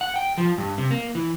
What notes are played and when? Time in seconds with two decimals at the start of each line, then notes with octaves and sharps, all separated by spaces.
0.01 F#5
0.16 G5
0.38 F3
0.58 G2
0.78 C3
0.91 A#3
1.15 E3